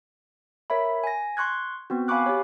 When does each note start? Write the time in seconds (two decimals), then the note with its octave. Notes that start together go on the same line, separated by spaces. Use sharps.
0.70 A#4 C#5 E5 B5
1.04 G#5 A#6
1.37 C6 C#6 F#6 G#6
1.90 B3 C4 F#4
2.08 F5 G#5 B5 C#6 D6 F#6
2.26 G4 C#5